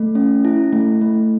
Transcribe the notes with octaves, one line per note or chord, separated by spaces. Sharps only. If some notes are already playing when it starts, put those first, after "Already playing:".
Already playing: A3
C#4
E4
A3
A3